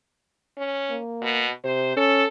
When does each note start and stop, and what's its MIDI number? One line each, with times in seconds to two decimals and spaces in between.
0.58 0.97 61
0.90 1.47 58
1.22 1.50 47
1.64 1.96 48
1.64 1.96 72
1.97 2.24 61
1.97 2.26 69